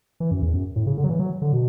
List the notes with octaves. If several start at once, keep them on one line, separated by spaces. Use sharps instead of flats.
E3
F#2
E2
F#2
A2
C#3
D3
F#3
E3
F#3
D3
B2